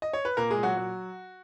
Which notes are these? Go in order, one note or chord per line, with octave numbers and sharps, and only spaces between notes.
D#5
C#5
B4
A#2 A#3 A#4
G#3 G#4
A#2
F#3 F#4
F#3